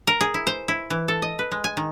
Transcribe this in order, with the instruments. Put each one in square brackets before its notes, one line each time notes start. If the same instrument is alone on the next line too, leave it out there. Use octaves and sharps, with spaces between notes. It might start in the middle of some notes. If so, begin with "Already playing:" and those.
[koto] A#4
G#4
E4
C5
E4
E3
A4
D#5
B4
G#3
G#5
D#3